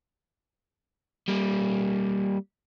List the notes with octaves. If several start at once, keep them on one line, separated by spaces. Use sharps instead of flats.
G3 A#3